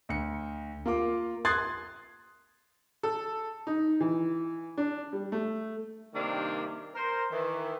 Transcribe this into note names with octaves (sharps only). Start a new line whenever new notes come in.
D2 C#7
A#3 F4 D6
C6 D#6 F#6 G#6 A6 C7
A4
D#4
E3
D4
G3
A3
G2 C3 D#3 A#3 D4
A#4 C5
D#3 E3